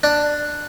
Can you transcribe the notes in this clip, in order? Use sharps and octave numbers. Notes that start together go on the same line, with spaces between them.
D4